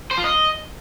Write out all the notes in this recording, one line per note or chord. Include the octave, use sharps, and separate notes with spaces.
C5
F4
D#5